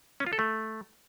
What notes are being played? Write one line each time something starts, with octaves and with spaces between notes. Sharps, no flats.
C#4
F4
A4
A3